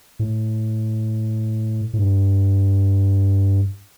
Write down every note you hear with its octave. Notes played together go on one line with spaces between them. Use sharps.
A2
A2
G2